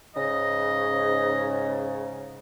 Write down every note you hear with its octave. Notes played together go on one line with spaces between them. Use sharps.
G#2 C#3 D#5